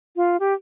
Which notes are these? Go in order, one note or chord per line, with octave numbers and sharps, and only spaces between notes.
F4
G4